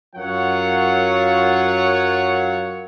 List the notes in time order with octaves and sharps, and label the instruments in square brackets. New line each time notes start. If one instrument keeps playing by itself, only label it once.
[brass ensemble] F#2 F#3 F4 A#4 C#5 F#5